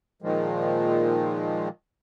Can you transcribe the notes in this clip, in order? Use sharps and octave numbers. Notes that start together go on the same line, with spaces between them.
A#2 D#3 F3 G#3